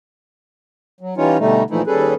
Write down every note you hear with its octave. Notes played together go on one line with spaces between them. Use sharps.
F#3
E3 G3 C#4 D#4 F4 C#5
B2 D3 G3 A3 D#4
A#2 E3 F3 A3 D#4 E4
D#2 G3 C#4 G#4 A4 B4